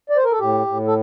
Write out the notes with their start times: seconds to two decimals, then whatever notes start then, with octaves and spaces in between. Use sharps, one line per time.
0.10 D5
0.17 C5
0.24 A#4
0.32 A4
0.40 A2 G4
0.67 A2
0.87 A4